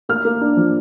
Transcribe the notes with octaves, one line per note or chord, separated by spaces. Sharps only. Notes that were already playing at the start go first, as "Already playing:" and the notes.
A#3 F6
A#3
D4
F3